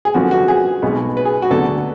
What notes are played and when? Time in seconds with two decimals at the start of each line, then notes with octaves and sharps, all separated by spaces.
0.05 G#4
0.14 F#2 D3 F3 B3 F#4
0.31 F#4
0.48 G#4
0.82 B1 B2 G#3 B3
1.17 B4
1.25 G#4
1.42 F#4
1.51 D2 D3 F#3 B3 A4